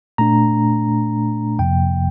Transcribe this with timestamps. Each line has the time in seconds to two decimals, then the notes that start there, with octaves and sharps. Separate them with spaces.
0.18 A#2 A3 D4 A#5
1.59 F2 C3 F3 A#3 G5